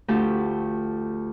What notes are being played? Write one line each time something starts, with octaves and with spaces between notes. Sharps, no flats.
D2 F3 A3 G4 A5